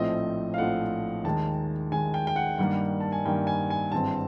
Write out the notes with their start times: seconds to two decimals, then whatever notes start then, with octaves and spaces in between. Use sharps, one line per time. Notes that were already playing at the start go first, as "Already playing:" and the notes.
Already playing: A#1 A2 F3 A3 C4 D#5
0.54 F5
0.58 A#1 A2 F3 A3 C4 F#5
1.24 D#2 D#3 G#3 A5
1.92 D#2 D#3 G#3 G#5
2.14 G5
2.27 G5
2.36 F#5
2.58 G2 D#3 G3 A#3 F#5
3.00 A5
3.12 G#5
3.25 G2 D#3 G3 A#3 G5
3.47 G#5
3.70 G#5
3.92 G#1 G2 E3 G#3 C4 A5